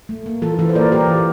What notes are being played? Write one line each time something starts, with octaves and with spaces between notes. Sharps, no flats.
A3
A#3
E3 F4 A4
E3 F4 A4
C5
A#3 A#4 D5
A#3 G4 A#4
E3